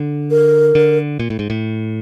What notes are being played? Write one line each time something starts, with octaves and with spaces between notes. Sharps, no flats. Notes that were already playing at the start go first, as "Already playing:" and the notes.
Already playing: D3
A#4
D3
A#2
A2
G#2
A2